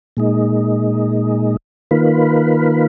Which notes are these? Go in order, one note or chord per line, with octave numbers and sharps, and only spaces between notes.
A#2 G#3 D#4
D#3 A#3 F4 B4